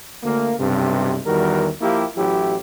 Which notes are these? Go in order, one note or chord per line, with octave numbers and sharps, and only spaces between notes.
D2 A#3
B1 G2 C3
E2 D#3 G3 F#4 A#4
F3 A#3 E4 G4
A1 F#3 E4 G4